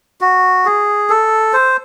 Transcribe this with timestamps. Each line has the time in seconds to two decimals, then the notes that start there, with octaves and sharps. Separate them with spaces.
0.21 F#4
0.66 G#4
1.10 A4
1.54 C5